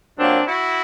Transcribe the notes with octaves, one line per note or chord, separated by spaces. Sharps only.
A#2 F#3 A#3 C4 D4
E4 F#4